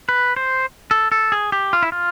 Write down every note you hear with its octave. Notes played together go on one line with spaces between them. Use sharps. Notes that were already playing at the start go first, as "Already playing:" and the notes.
B4
C5
A4
A4
G#4
G4
F4
E4
F4